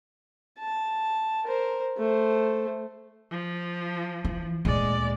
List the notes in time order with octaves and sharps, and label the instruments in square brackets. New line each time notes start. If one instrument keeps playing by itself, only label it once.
[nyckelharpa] A5
A#4 C5
A3 C5
[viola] F3
[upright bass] E3
[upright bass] D2 A#2 [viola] G#3 D5